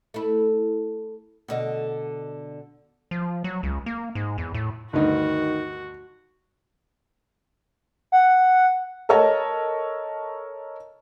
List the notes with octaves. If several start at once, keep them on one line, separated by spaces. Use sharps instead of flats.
A3 E4
B2 D3 D#5
F3
F#3
C#2
A#3
G#2
E2
A2
D2 G2 D#3 D#4 F#4
F#5
A4 A#4 C#5 D#5 A5